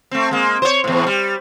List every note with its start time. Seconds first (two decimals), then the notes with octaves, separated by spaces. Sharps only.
0.11 A3 C4
0.31 G#3 A#3
0.62 C5 C#5
0.84 E2 A2
1.07 G3